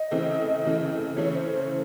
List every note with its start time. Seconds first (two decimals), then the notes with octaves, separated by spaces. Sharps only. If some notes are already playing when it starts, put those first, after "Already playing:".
Already playing: D#5
0.11 C#3 E3 A3 C4
0.64 C#3 E3 A3 C4
1.17 C#3 E3 A3 C#4 C#5
1.34 C5
1.52 C5